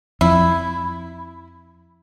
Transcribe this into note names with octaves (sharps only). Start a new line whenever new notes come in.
F2 E4